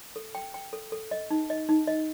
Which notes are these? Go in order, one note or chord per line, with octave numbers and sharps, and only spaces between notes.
A4
G5
G5
A4
A4
D#5
D#4
D#5
D#4
D#5